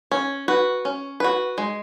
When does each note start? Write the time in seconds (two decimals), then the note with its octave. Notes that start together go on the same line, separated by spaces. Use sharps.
0.11 C#4
0.48 F#4 B4
0.85 C#4
1.20 F#4 B4
1.58 G#3